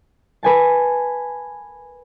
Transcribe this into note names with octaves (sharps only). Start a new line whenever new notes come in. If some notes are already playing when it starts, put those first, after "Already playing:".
B4 G#5 A5